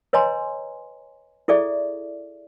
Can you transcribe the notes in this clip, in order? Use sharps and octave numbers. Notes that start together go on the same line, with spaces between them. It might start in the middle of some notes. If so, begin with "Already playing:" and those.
B4 C#5 D#5 G#5 A#5 C6
E4 G#4 A4 D5 E5